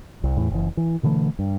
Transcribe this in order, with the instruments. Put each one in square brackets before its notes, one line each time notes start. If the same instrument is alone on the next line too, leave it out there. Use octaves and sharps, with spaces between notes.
[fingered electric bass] C2
E2 A2 E3
F#1 E3
E3
B2 D3 E3 A3
G2